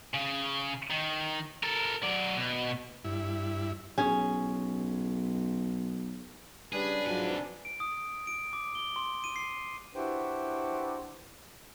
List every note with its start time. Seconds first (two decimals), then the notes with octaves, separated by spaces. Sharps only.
0.14 C#3
0.90 D#3
1.63 A4 A#4
2.03 F#3 D5
2.37 B2
3.05 G2 E4
3.98 B1 C#4 G#4
6.73 C#3 G3 D4 G#4 B4
7.06 G#2 C3 F3 F#3 G#5
7.65 D7
7.80 D#6
8.27 D7
8.53 D6
8.75 G7
8.96 C6
9.24 D#7
9.36 C7
9.95 D4 E4 F#4 G4 B4 C5